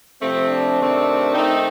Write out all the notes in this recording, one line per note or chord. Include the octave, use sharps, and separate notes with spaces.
C3 F3 A3 C4
D4
C3 D#3 A3 C4
D#3 A3 C4 D#4